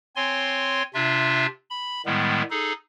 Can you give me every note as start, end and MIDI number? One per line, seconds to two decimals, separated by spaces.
0.16 0.83 60
0.16 0.83 73
0.16 0.83 80
0.16 0.83 84
0.94 1.46 48
0.94 1.46 62
0.94 1.46 65
0.94 1.46 76
1.70 2.02 83
2.06 2.42 45
2.06 2.42 51
2.06 2.42 55
2.06 2.42 56
2.06 2.42 59
2.50 2.73 63
2.50 2.73 68
2.50 2.73 69